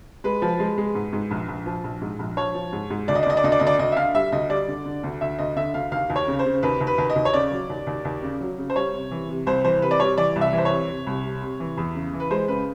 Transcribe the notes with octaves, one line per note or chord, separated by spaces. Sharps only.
G#3 B4
F3
G#3
G#3
G#2
G#2
A#1
A#1
F3
A#1
G#2
A#1
F3 C#5
F3
G#2
G#2
D2 D5
D#5
D5
D2 D#5
D5
D2 D#5
D5
D2 D#5
D5
D2 D#5
E5
D3 F5
G3 E5
D2 D#5
G3 D5
D3
D3
D2
D2 E5
D2 D#5
D3 E5
D2 F5
D#2 F5
D#2
C#5
C#3
C5
C#3
D#2 B4
D#2
B4
D#2
D#5
D#2
C#5
C#3 D5
F#3
D#2
D#2
D#2
C#3
F#3
C#3
C5
G3 C#5
C3
E3
C3
C2 C5
E3 C5
C3 B4
D5
G3 C#5
E3 D5
C2
E5
E3 C5
C#5
C3
C3
C2
C3
C3
E3
E2
C#3
E3
B4
G#3 C5
C#3 B4